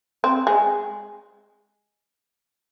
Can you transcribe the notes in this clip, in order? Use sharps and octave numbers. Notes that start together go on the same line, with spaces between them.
C4
G#3